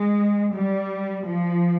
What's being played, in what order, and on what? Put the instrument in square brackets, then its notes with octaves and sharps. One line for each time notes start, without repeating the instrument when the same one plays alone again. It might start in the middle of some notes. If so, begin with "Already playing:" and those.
Already playing: [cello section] G#3
G3
F3